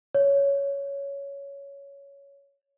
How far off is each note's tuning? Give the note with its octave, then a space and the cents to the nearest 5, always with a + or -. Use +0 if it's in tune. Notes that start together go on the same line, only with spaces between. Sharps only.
C#5 +10